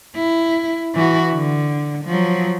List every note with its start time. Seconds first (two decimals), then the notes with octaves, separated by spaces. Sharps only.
0.16 E4
0.95 E3 F#4
1.34 D3
2.05 F3 F#3